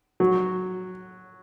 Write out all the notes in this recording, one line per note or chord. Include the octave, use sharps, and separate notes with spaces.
F#3